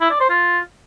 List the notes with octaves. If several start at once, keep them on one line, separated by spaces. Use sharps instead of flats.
E4
D5
C5
F4